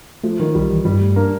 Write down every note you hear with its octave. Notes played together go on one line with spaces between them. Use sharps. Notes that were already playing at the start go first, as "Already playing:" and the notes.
F3 A3
D#3 F#3
B1 G3
E3
G2 G3
A3
A#3 D4